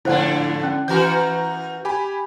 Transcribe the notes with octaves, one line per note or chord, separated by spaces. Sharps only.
F2 G#2 D3 D4 E4 C5 F#5
C#4
E3 F#4 A#4 A#5 G6
G4 G#5 B5